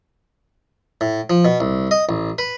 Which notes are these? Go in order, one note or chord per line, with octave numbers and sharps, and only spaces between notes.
A2
F3
B2
C2
D#5
A1
B4